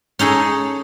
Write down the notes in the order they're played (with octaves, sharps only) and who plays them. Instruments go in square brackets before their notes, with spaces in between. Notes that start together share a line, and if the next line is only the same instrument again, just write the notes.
[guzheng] C#4 D#4 G#4 A4